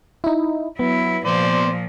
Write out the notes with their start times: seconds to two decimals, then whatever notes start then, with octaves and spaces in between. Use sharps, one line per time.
0.24 D#4 E4
0.79 F#3 B3 E4
1.26 A#2 F3 C5 D5